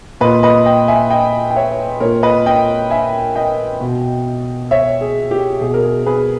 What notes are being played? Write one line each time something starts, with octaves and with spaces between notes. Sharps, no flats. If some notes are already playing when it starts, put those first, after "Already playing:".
A#2 B4 D#5
B4 D#5
D#5 G5
E5 G#5
D#5 G5
G5
C#5 E5
A#2 A#4 C#5
B4 D#5
D#5 G5
E5 G#5
D#5 G5
B2
C#5 E5
G#4
G4
B2 G#4
A#4
G#4
G#4 B4